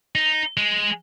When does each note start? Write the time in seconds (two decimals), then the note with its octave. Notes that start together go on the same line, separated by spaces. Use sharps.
0.15 D#4
0.57 G#3